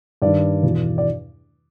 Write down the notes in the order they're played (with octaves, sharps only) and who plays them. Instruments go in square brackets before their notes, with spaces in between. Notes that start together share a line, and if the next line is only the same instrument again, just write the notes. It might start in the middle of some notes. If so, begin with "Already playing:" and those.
[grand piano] G2 D#3 D5
E2 B2
D5